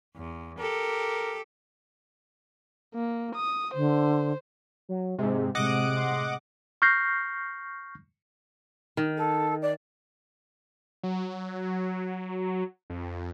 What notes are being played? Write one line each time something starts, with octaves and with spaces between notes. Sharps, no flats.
E2
G4 A4 A#4
A#3
D#6
D3 C5
F#3
G#2 C3 G#3
A2 C3 G#3 D#5 F#5 D6 D#6
C6
C#6 F6 G6 A#6 C7
D#3
A4
D5
F#3
F2